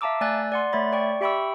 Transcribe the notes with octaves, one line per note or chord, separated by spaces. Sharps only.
E5 F5 A5 A#5 D6 E6
A3 D5 G#5 E6 F#6 A6
D5 F#5 C6
A3 C#5 E5 B5 A6
D5 G5 C#6
G4 E5 G5 B5 C#6 E6